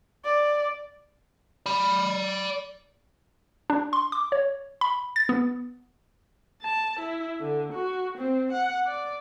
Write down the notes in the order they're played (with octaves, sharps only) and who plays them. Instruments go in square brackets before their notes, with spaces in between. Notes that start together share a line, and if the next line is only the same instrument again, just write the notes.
[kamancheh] D5
[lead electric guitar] D5 B5
[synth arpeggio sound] D4
C6
D6
C#5
B5
A6
B3
[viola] A5
E4
D3
F#4
C4
F#5
D5